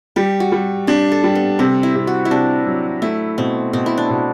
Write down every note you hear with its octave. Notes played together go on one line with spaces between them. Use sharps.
G3 G4
F#4
G3
D4 G4
A4
G3
B3
C3 C4
E4
C3
F#4
E4
C3 D4
F#3
A3 E4
B2 C4
B2 C4
E4
D4
B2